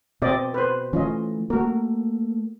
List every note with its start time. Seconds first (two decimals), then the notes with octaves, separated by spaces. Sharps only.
0.22 B2 C4 D5 D#5
0.54 B4 C5
0.93 E3 A3 C#4 F4 D#5
1.50 A3 A#3 F#4 A#4